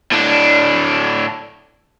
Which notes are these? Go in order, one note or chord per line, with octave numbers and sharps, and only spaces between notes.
A2 D4